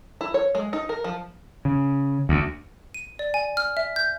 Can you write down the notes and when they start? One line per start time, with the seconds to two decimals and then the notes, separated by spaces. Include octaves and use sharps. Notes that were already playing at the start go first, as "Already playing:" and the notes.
0.21 E4
0.34 C#5
0.55 G#3
0.73 D#4
0.89 A#4
1.04 F3
1.65 C#3
2.29 D2
2.94 D#7
3.19 D5
3.34 G#5
3.57 F6
3.77 E5
3.96 G6